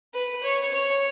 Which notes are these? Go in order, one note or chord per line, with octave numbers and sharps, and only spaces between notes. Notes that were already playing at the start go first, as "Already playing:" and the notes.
B4
C#5
C#5